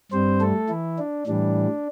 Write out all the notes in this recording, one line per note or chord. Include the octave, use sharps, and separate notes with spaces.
G2 G3 C4 C5
A3 A4
E3 E4
D4
A2 E3 G3 D4